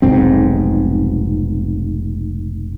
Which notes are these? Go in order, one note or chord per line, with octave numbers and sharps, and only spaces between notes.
F1 B1 G#2 C4